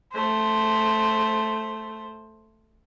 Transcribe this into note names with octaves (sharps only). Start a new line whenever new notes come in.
A3 C5